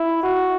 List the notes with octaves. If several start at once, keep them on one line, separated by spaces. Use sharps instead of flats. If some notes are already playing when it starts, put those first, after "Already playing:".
Already playing: E4
F#4